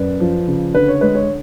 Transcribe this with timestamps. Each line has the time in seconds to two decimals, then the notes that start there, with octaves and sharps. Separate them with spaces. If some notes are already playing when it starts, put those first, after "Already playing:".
Already playing: F#2 B4 D5
0.20 F3
0.48 C#3
0.75 D3 B4
0.88 C#5
1.01 G#3 B4
1.15 C#5